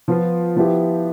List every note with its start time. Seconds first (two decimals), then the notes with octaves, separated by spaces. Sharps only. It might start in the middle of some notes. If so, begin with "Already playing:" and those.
0.08 F3 B3 F4
0.56 F3 B3 E4 G4